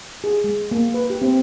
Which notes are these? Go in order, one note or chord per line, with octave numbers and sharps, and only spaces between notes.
G#4
G#3
A#3
B4
G4
C4